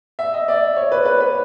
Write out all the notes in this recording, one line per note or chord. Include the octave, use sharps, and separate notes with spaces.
E5
D#5
D5
C#5
B4
B4
B4